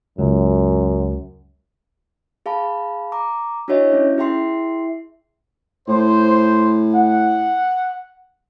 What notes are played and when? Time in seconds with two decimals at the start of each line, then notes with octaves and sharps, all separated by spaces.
0.19 C#2 F#2
2.46 G#4 F5 A5 B5
3.12 A#5 D6
3.68 D4 E4 F#4 C#5 D#5 E5
3.92 C#4 E4
4.18 E4 G#4 E5 G5 C6 C7
5.88 A2 C5
6.94 F#5